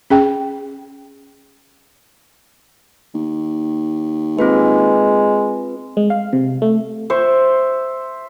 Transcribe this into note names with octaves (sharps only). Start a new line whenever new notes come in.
C#4 G#4 G5
D#2
G#3 C4 F4 B4
G#3
F5
C3
A3
C5 E5 C#6